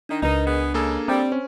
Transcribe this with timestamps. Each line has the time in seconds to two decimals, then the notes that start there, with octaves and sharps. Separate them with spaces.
0.09 D#3 D4 D#4
0.23 C#2 D#4 A#4 B4 D#5
0.45 B3 D4 G#4
0.74 C#3 G#3 A#3 G#4 A4
1.08 G3 C4
1.32 C#4 C5